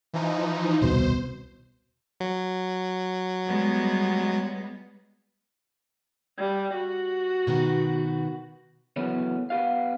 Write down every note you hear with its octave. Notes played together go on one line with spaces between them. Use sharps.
E3 F3 D#4
D#1 C2 B2 C5
F#3
G3 G#3 B3
G3
F#4
B2 D#3 B3
C#3 E3 F#3 A3 B3 C#4
B3 G4 F5